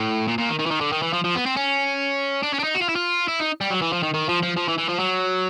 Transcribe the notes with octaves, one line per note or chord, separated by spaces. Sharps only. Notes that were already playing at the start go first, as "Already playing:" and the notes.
Already playing: A2
A#2
A#2
D#3
D#3
E3
D#3
D3
D#3
E3
F3
F3
B3
C4
C#4
D4
C#4
D4
D#4
F#4
F4
E4
F4
E4
D#4
G3
F#3
E3
F3
D#3
D#3
F3
F3
F3
E3
E3
F3
F#3